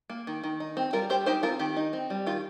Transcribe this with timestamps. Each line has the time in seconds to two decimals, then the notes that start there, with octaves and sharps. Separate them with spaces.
0.10 A#3
0.27 D#3
0.44 D#3
0.60 D#4
0.77 C4
0.93 G3 F4 A#4
1.10 G3 G4 C5
1.26 D#4 G4 C5
1.43 C4 F4 A#4
1.59 D#3 G4
1.76 D#4
1.93 C4
2.10 G3
2.27 D#3 F4